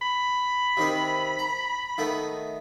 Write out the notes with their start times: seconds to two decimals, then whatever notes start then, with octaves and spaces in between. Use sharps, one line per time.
0.02 B5
0.77 C3 D#3 C4
1.39 A#5
1.98 D#3 A3 B3